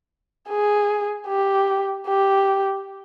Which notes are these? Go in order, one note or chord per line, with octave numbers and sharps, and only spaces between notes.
G#4
G4
G4